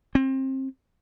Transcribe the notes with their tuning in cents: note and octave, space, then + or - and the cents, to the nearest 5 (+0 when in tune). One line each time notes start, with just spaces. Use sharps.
C4 +25